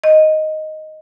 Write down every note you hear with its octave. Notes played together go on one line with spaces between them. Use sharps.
D#5